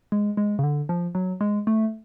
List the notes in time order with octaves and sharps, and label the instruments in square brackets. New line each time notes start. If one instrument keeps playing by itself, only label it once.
[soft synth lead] G#3
G#3
C#3
D3
F3
F#3
G#3
A3